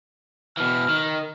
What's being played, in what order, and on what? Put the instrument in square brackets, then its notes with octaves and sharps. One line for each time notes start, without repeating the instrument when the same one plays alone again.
[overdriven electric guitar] B2 E3 [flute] F6
[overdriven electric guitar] D#3